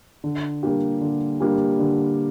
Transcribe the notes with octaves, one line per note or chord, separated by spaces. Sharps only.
D3
G3 A#3 D4 G4
D3
G3 A#3 D4 G4
D3